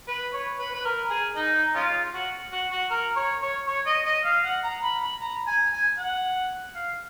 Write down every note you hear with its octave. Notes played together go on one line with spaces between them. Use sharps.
B4
C#5
B4
B4
A#4
G#4
D#4
G#3 C#4 F4
F#4
F#4
F#4
A#4
C#5
C#5
C#5
D#5
D#5
F5
F#5
A#5
B5
B5
A#5
G#5
G#5
F#5
F5